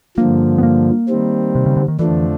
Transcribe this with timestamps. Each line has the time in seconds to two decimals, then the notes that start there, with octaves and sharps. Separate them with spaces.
0.17 G2 D3 F3 A#3
0.58 B3
0.63 A#3
1.09 D#3 G3 C4
1.55 C3
1.66 C#3
1.77 D3
1.88 D#3
1.99 F2 D3 E3 F3 A3 D4